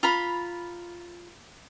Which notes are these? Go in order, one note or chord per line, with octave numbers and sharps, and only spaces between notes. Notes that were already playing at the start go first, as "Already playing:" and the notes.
F4 A#5 B5